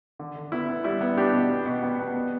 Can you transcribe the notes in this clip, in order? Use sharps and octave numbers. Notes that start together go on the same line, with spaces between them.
D3
D3
B3 E4
B3
G3 E4
B3
G3 D4 G4
B2
B3
B2
B3
B3
B3